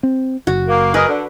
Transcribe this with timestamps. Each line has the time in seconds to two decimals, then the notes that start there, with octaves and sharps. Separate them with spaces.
0.03 C4
0.47 F#1 F#4
0.68 A#3
0.94 G#4 A#4 B4 D#5
1.09 D3